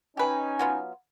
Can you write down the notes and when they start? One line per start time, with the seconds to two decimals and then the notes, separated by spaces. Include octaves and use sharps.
0.17 C#4 D#4 G4 B4 G#5
0.59 F#3 B3 F4